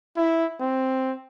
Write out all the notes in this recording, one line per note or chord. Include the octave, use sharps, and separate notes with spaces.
E4
C4